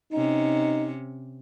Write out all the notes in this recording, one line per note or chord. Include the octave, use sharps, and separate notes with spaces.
C3 C#4 D#4